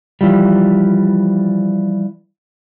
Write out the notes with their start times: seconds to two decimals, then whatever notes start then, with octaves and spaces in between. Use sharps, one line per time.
0.21 E3 F3 G3